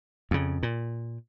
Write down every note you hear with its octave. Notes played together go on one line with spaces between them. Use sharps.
F2 C#3
A#2